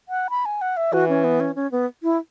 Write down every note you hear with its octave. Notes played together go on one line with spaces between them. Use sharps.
F#5
B5
G#5
F#5
E5
E3 F#4
C#4
B3
C#4
C#4
B3
E4